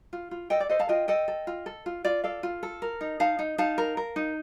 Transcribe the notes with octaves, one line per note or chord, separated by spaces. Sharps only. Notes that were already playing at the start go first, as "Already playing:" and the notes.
F4
F4
A4 D#5 G5
D5
A4 C5 D#5
F5 A5
F4 D#5 G5
A4 D#5 G5
A4
F4
A4
F4
F4 D5
A4 D5 F5
F4
A4
A#4
D#4
D#4 F5 A5
D#4
D#4 F5 A5
A#4
A#4
D#4